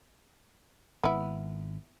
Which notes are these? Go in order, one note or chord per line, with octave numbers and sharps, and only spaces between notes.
G#1 B3 E4